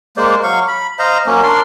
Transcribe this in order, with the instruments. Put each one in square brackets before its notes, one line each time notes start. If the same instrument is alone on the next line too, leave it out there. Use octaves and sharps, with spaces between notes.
[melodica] G#3 A#3 C5 D5
F#3 F5 C#6
B5
C5 D#5 F5 A#5
F#3 A#3 C#4
D4 A#4 D5 C6